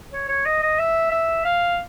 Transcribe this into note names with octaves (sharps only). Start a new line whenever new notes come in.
C#5
C#5
D#5
D#5
E5
E5
F5